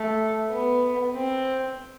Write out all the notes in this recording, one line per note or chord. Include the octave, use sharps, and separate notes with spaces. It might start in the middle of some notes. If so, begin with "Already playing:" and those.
Already playing: A3
B3
C4